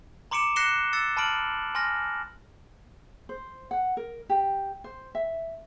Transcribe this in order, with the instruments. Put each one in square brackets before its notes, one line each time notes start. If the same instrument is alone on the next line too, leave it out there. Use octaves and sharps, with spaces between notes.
[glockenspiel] A#5 C6 D6 C#7 D7 E7
F#6 A#6 C7 C#7 E7 G7
E6 A6 C#7 E7
A5 B5 F6 D7 F#7
G#5 C6 F6 A#6
[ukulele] C5
F#5
A#4
G4
C5
E5